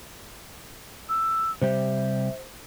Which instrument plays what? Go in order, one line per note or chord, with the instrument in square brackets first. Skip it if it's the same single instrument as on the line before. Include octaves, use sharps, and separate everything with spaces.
[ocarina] E6
[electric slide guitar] C3 G3 G4 [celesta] C5 [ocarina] E5